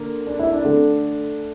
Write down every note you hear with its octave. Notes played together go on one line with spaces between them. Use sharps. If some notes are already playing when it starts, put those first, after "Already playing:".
Already playing: D3 A#3
D4
E4
D4
D3 A3